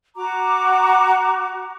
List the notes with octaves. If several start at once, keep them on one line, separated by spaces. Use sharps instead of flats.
F#4 A#5 D6